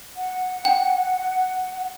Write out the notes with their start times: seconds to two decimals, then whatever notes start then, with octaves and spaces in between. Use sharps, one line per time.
0.16 F#5
0.65 G5